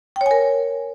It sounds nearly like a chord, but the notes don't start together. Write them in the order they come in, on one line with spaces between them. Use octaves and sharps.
G5 C#5 G#5 A#4